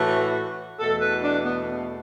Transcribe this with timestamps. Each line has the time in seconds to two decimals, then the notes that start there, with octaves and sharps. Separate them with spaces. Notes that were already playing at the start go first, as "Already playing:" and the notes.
Already playing: A2 E3 A3 F#4
0.80 E2 B2 A3 A4
1.01 B4
1.24 D4
1.45 B3
1.67 B3